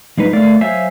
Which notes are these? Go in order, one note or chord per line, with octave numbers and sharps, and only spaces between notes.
F3 G#3 D#4 B4
A3 A#4 D5 F5
F#3 C5 E5 F5 G#5